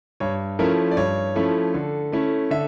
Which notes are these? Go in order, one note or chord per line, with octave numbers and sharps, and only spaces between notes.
G2 C#5
F3 A3 C#4 E4 A#4
D5
G2 C#5
F3 A3 C#4 E4
D3
A3 C#4 E4
D3 E5